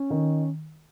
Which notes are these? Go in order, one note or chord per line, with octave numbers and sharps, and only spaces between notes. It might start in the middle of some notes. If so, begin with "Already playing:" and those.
Already playing: C#4
D#3